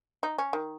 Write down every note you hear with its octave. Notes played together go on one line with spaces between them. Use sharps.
D#4
C#4
D#3